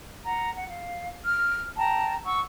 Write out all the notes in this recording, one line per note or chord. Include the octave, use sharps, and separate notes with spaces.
F#5 A#5
F#5
F5
F6
G5 A5 A#5
F#5 C#6 E6